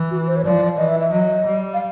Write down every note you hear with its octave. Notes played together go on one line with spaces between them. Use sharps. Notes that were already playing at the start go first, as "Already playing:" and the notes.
Already playing: E3
F#4
C5
C#5
F3 D5
E3 D#5
E5
E5
F#3 D#5
G3
F5